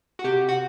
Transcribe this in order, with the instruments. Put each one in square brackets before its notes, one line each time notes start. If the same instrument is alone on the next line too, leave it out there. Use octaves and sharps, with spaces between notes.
[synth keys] F#4
C3 G4
F#4